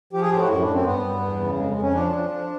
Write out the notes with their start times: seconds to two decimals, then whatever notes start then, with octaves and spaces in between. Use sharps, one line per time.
0.13 F3 G4
0.22 G#4
0.31 A2 G4
0.40 F#4
0.49 F#2 E4
0.61 D4
0.67 F#2
0.74 C4
0.85 G2 B3
1.04 G2
1.22 E2
1.40 C#3
1.58 F2 G#3
1.70 G#3
1.76 F2
1.82 C#4
1.95 F3 D4
2.13 F3
2.30 F3